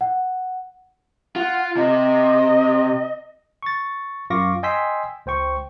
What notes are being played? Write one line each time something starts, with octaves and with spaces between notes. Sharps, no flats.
F#5
F4 F#5
C3 D#5
C#6 A6
F#2 F4 F5 C#6 D6 A#6
D#5 G5 G#5 C6 E6 B6
C#2 C5 G5 C#6